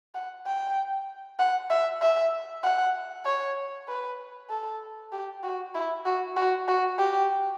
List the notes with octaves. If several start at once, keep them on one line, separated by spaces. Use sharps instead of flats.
F#5
G5
F#5
E5
E5
F#5
C#5
B4
A4
G4
F#4
E4
F#4
F#4
F#4
G4